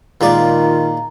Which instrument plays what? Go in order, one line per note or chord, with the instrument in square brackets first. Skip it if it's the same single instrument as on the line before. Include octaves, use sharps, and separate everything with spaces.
[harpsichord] A#2 G#3 D5 [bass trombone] D#3 [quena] F4 [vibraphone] A#5